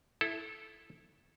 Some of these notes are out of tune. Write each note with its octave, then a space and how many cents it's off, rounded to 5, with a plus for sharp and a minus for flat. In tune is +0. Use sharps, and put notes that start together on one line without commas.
E4 +0 A4 -15